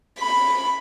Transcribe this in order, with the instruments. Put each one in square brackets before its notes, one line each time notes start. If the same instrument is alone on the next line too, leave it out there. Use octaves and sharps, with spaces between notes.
[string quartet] B5